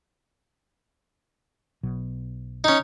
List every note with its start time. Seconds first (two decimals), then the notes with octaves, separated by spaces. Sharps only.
1.83 B1 B2 F#3
2.64 C#4 D#4